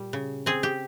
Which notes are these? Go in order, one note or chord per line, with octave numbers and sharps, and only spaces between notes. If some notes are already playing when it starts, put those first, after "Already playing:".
Already playing: A#2 G3
C#3
C4 G#4
G4